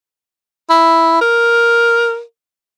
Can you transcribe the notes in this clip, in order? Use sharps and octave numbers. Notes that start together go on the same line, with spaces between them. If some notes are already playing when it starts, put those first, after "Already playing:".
E4
A#4